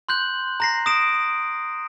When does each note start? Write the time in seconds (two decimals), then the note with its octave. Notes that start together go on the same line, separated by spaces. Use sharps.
0.09 C6 F#6 G6 F#7
0.60 A#5 A#6 C7
0.86 D#6 A#6 D7 E7